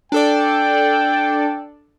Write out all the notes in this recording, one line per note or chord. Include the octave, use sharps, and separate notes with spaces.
D4 A4 D5 G5